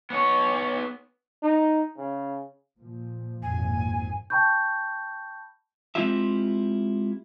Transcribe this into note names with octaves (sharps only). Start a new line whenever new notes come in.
B3 C#5
D#4
C#3
A#2 F3
G#1 F2 A#2 G#5
G5 A5 B5 C#6 G6
G#3 C4 E4 F4 G4 E5